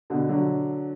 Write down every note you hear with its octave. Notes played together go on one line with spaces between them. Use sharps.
B2 D3
D3 F#3